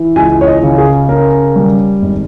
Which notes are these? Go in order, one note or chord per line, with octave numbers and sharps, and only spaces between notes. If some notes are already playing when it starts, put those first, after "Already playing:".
Already playing: E3
C#2 G#5
C#5
D#5
C#3
G#4
C#4 A#4
G3
G#1